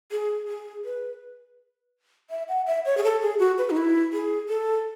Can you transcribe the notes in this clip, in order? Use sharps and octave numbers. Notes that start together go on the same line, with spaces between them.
G#4
G#4
B4
E5
F#5
E5
C#5
G#4
A4
G#4
F#4
B4
D#4
E4
G#4
A4